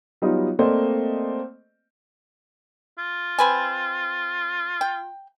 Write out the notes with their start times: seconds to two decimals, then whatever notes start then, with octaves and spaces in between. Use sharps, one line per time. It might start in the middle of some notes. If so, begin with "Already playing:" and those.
0.22 F#3 G3 B3 D#4 F4
0.59 A3 A#3 C4 C5 D5 D#5
2.98 F4
3.39 C4 B4 G#5
4.81 G5